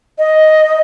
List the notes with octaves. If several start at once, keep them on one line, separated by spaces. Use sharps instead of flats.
D#5